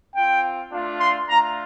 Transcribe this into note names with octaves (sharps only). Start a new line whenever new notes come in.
C4 F4 G5
A3 D4 F4
C6
A3 D4 F4 A#5